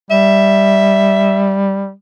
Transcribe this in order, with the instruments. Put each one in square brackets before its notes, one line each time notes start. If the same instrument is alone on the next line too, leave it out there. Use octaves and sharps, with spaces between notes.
[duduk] G3 [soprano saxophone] E5